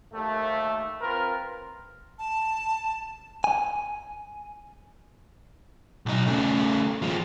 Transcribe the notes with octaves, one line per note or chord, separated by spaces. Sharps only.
D#2 A3
C4 F4 A#4 B4
A5
G#5
B1 D#4
C#3 A3
F3 G#3